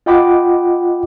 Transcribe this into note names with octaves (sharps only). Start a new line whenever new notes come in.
F4 D#5 F#5 G5 B5 D6